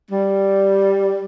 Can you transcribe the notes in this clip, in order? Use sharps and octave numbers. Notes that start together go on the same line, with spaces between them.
G3